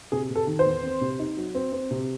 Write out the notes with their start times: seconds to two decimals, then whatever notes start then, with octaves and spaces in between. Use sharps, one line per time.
0.12 C3 G#4
0.30 C3
0.36 A4
0.47 D#3
0.59 C5
0.66 E2
0.83 C4
1.01 C3
1.19 D#4
1.37 F#3
1.55 C4
1.72 C4
1.91 C3